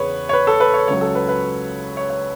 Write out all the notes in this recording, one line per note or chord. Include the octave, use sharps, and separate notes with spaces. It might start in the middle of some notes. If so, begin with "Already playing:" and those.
Already playing: E2 C#3 G#4 B4 C#5
C#5
B4
A4
B4
C#5
C#2 C#3 F#3 C#5
A4
B4
B4
C#5
C#5